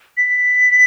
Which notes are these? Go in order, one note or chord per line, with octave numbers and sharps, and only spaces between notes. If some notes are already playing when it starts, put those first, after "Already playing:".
B6